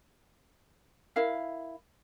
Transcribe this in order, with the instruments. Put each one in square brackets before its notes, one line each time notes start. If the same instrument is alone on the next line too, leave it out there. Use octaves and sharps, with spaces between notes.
[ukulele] E4 A#4 F5